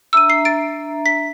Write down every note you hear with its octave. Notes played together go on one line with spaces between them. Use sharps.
D4 E5 A#5 E6 D#7
C7
A6 D7
B6